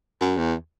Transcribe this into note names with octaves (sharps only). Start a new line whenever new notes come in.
F#2
E2